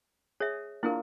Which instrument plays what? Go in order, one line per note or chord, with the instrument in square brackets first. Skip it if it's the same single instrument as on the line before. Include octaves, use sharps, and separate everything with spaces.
[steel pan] G#4 [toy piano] C#5 E5
[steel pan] A#3 D4 F4 [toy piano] E4 G#4 A#4